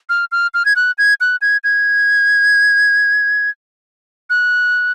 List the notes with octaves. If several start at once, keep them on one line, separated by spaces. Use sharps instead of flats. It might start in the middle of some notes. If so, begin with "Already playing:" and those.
F6
F6
F6
G#6
F#6
G#6
F#6
G#6
G#6
F#6